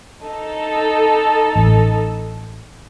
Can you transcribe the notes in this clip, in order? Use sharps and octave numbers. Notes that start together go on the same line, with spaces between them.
D#4 A4
A1